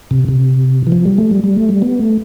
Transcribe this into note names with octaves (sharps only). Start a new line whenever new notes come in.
C3
C3
E3
F3
G3
A3
G3
G3
A3
G3
B3
A3